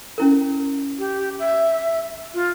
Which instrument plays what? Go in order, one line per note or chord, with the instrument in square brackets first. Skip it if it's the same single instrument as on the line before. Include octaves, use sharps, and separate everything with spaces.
[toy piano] C#4 E4 A#4
[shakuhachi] G4
E5
F4